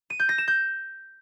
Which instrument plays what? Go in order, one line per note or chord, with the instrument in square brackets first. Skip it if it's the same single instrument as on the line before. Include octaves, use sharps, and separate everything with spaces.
[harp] D#7
G6
A#6
E7
G6